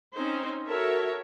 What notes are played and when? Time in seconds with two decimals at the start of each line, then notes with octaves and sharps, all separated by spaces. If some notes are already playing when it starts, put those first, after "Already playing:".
0.14 C4 C#4 D#4 C5
0.66 F#4 A4 A#4 C#5 E5